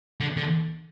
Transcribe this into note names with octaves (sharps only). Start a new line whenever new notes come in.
D3
D3